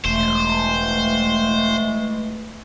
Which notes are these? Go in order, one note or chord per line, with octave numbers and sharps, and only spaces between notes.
E1 E3 G#3 A3 C5